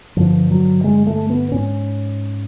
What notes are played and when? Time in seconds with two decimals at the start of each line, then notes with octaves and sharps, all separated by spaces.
0.17 G2 D3 F3
0.51 F#3
0.84 G#3
1.07 A3
1.30 B3
1.52 G#2 C#4